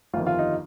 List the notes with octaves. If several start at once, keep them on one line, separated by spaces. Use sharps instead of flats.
G1 F2 D#3 F4
F4
D#4